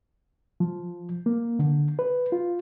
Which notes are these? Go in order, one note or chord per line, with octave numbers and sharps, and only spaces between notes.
F3
A#3
D3
B4
F4